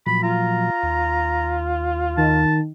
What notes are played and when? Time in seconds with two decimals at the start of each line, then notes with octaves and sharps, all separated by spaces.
0.06 A#2 F3 F#3 B5
0.23 F4 A#5
0.83 D#2
2.17 D#3 A5